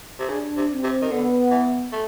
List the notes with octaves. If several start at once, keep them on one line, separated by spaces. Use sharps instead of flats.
C3
C#3 D4
C3
C4
C3
D#3
D3 B3
E3
A3